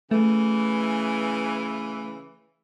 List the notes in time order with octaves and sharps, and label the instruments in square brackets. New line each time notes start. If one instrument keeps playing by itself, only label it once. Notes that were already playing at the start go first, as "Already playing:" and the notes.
[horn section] C#3 E3 [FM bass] A3